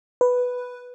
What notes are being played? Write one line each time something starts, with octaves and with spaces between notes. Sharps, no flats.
B4